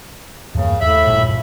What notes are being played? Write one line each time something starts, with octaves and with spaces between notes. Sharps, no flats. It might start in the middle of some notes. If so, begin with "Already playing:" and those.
E2 G2 C#3 A#3
D#2 A2 E5 B5
A1 G2 A#2